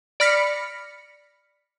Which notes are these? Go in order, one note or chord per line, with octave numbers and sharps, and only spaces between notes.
D5 B5 F6 A#6 B6 C#7